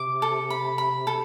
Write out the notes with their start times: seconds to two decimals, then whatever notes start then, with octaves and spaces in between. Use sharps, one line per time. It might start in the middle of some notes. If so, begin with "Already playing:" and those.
Already playing: C3 D6
0.22 A4
0.50 B5
0.78 B5
1.07 C3 A4